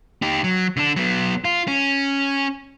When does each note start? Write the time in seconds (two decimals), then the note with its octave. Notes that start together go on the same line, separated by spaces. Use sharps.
0.22 D#4 G4
0.44 F#3
0.77 D3 D4
0.96 F#3 B3
1.45 F4
1.68 C#4